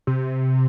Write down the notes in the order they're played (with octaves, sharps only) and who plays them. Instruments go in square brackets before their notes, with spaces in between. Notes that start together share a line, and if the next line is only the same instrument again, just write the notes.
[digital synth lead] C3